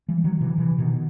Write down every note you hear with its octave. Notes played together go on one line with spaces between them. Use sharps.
E3 G3
D#3 F#3
C3 E3
C3 E3
B2 D#3